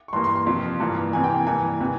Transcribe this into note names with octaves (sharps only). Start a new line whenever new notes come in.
C#6
G2 E3 G3 A#3 C6
C6
C6
F2 C3 F3
G2 E3 A#3
C3 E3 A#3 G#5
G5
G#5
G2 E3 A#3 G#5
C3 E3